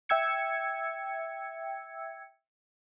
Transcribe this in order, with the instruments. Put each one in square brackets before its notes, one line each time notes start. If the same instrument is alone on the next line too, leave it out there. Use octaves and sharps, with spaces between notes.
[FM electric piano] E5 G5 E6 G#6 C#7